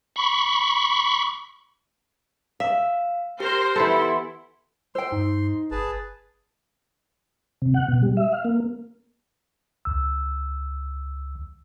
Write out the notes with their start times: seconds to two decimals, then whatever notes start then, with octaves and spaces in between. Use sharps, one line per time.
0.16 B5 C#6
2.60 E5 F5
3.40 G4 A#4 C5
3.76 E3 B3 E4 A4 C6
4.95 C5 G5 C6 E6
5.12 G2 D#4
5.71 G1 G#4 B4 A5
7.62 C3
7.74 F#5
7.88 B2
8.02 G3
8.17 E5
8.32 F5
8.45 A#3
9.85 C#2 E6